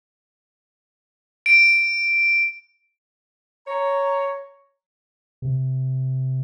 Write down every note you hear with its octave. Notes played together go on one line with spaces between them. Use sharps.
D7
C#5 A#5
C3